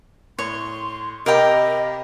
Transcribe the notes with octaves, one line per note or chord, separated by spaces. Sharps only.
A2 C#5 C6
C3 G4 A#4 D#5 F5 G5 B5